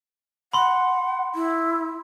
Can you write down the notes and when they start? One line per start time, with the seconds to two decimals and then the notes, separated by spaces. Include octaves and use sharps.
0.53 F#5 B5 C6
1.35 E4